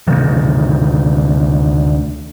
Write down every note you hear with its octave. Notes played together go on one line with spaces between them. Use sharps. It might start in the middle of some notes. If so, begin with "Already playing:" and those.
D2 C3 D#3 E3